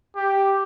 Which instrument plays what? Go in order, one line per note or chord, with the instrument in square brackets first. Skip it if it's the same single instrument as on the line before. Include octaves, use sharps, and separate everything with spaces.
[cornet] G4